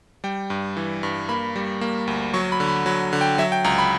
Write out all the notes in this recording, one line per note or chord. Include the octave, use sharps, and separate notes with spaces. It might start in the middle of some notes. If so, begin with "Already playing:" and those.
G3 G5
G2
E3
G2
A#3 B5
G3
A#3
D2
F#3 C#6
B5
D3
B5
F#3 B5
D3
G5
F#3 E5
G5
C#2 A#5
B5